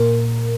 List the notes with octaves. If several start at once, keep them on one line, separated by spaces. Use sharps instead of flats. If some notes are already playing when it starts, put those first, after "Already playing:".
Already playing: A#2 A#4